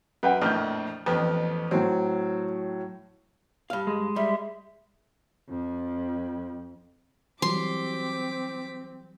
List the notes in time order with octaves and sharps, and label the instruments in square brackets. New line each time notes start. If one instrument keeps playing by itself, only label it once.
[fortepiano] F#2 [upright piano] B4 F#5 G5
[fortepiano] A#1 F2 A2 [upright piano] F6 G6
[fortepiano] A1 F2 B3
[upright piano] A2 F#3 [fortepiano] C4
[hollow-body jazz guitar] G2 F5
[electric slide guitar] G#3
[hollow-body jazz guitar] G3 [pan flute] E5
[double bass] F2
[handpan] E3 F#3 G3 [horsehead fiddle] C4 [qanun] C6 [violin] D6 B6